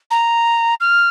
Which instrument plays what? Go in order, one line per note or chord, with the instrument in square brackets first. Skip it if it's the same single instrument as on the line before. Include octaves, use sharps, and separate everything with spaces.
[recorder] A#5
F6